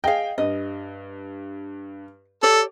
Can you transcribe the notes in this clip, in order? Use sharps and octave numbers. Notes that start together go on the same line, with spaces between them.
G#4 D#5 F5 G5
G2 D#5
G4 A4 C#5 D5